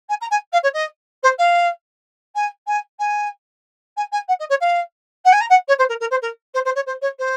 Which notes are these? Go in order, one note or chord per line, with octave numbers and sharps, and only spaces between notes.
G#5
A#5
G#5
F5
C#5
D#5
C5
F5
G#5
G#5
G#5
G#5
G#5
F#5
D#5
C#5
F5
F#5
G#5
A#5
F#5
C#5
C5
A#4
A#4
C5
A#4
C5
C5
C#5
C5
C#5
C5